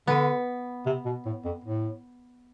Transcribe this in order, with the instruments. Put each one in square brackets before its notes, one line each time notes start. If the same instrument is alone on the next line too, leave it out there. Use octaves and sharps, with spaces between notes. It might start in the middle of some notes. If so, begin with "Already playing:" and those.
[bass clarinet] D3 [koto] B3
[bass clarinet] C3
B2
A2
F2
A2